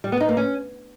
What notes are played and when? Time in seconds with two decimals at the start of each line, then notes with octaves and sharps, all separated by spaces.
0.04 G3
0.12 B3
0.20 D#4
0.29 A#3
0.37 C#4